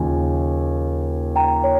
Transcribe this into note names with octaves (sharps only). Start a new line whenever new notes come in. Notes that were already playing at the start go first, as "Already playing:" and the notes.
Already playing: D#2 C#3 F3 G#5
G5 A#5
C#5